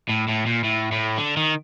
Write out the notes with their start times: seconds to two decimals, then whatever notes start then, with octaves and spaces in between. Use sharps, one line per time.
0.09 A2
0.28 A2
0.46 A#2
0.64 A2
0.92 A2
1.18 D3
1.37 D#3